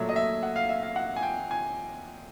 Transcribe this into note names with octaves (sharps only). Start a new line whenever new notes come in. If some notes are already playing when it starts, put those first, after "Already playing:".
Already playing: A#2 F#3 A3 E5
D#5
E5
F#5
F5
E5
F5
F#5
G#5
G5
G#5